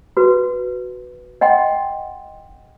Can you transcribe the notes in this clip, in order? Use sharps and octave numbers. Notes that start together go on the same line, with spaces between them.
F#4 B4
D#5 F#5 G5 C6